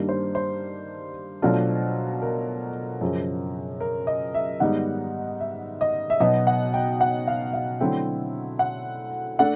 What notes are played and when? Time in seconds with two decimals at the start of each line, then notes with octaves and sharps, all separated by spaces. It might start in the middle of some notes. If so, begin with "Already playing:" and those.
Already playing: G2 D#3 G3 A#3 D4
0.09 C5
0.35 C5
1.42 B2 F#3 A3 D4 F4
2.22 A#4
3.01 F#2 C#3 F3
3.80 A#4
4.07 D#5
4.34 E5
4.60 G#2 D#3 G3 B3 D#4 F#5
5.40 E5
5.81 D#5
6.10 E5
6.20 B2 F#3 B3 D#4 D#5
6.47 F#5
6.74 G5
7.01 F#5
7.27 F5
7.54 F5
7.81 D3 F#3 A3 C4 E4 G5
8.59 F#5
9.39 A3 D4 F#5